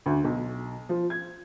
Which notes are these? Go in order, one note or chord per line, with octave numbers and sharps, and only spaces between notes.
D2
B1
F3
G#6